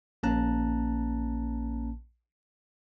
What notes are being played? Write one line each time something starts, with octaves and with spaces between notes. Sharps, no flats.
A#1 A#3 C#4 A5 A#5 F#6